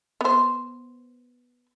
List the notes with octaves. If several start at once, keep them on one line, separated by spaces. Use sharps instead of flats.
B3 C5